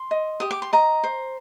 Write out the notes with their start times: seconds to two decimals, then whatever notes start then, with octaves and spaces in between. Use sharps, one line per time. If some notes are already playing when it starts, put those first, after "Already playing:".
Already playing: C6
0.11 D#5
0.40 G4 D#6
0.51 D6
0.62 C6
0.73 D#5 A#5
1.04 C5